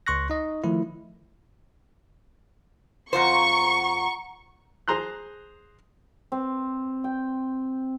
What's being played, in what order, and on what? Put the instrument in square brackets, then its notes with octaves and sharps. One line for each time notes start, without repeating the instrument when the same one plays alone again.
[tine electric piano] C#2 C6 C#6 F#6 A#6
D#4 D#5
D#3 F3 A3 E4
[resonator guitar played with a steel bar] F2 F4 C5 [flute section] F#5 A#5 [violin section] C#6
[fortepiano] G#4 C5 A#5 C6 F#6
[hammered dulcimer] C4
G5